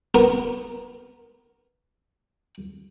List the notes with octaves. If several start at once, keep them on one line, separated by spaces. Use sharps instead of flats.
B3 A#4